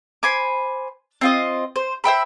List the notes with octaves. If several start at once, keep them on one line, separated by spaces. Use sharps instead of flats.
C5 G#5 B5 D6
C4 F4 D#5
C5
C5 E5 G5 B5